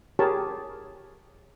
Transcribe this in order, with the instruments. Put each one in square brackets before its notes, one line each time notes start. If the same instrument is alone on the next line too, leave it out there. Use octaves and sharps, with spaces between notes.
[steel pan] G4 G#4 A#4 C#5 A5